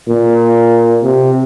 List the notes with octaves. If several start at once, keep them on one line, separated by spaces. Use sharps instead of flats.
A#2
C3